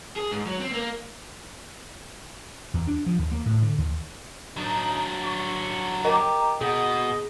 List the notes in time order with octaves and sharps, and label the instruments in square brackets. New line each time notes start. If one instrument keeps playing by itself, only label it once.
[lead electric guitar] G#4
G#2
F#3
C4
A#3
[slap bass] E2
D4
F3
D#2
A#3
A2
D3
D#2
[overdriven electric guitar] F#3 D4 [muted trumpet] D#4
[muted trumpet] C#6
[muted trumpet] G4 [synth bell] A#4 D#5 A#5
[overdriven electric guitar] B2 [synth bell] G#4 [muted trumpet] D#5